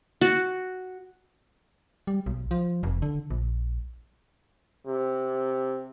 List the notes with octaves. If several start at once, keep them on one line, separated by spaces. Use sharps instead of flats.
F#4
G3
B1
F3
F1
D3
A#1
C3